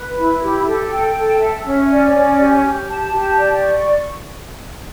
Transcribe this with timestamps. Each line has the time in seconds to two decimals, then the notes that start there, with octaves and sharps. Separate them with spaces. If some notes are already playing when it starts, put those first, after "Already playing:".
Already playing: B4
0.16 E4
0.41 G4
0.65 A4
0.90 G5
1.15 A4
1.39 E5
1.65 C#4
1.89 D5
2.14 C#4
2.38 G4
2.63 G4
2.88 A5
3.13 G4
3.38 D5
3.62 C#6